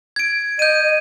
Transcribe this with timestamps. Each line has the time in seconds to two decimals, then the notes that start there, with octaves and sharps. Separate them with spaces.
0.16 G#6 D7
0.59 D#5 G6 D#7